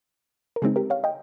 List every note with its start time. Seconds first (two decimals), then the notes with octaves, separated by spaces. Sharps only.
0.56 A#4
0.62 C#3 G#3 C4 D#4 G#4
0.76 G4 A#4
0.90 C#5 F5
1.04 D#5 G5